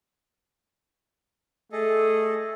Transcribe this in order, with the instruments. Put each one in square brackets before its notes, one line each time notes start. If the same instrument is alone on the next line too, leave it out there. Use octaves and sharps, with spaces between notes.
[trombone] A3 [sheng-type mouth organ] G#4 A4 D#5